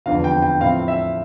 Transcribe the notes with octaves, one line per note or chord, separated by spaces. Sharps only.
F1 E2 D3 F3 F5
G5
G5
A2 F3 C4 E4 F5
E5